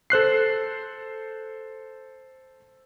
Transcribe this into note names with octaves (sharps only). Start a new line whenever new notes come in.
A4 C5 F#6 C7